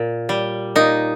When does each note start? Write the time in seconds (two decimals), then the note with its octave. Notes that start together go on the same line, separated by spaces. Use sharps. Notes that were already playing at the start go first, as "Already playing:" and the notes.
Already playing: A#2
0.29 G3
0.75 A#2 D#4